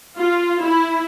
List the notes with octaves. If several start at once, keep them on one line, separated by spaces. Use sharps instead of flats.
F4
E4